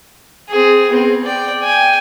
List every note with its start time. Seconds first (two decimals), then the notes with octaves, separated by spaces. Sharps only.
0.48 C4 G#4
0.90 B3 C4
1.23 D5 G5
1.62 G5 G#5